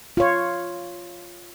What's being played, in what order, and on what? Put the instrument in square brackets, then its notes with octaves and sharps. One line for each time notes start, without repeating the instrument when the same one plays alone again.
[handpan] F4 C#5